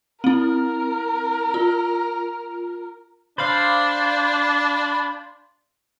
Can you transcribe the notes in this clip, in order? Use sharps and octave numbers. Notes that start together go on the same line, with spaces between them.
C4 E4 A#4
F4
D4 C5 D5 F5 B5